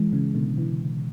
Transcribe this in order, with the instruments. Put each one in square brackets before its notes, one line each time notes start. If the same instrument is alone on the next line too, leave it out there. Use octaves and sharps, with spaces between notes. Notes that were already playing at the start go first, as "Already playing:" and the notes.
Already playing: [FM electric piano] E3 G#3
C#3 E3
B2 D3
C#3 E3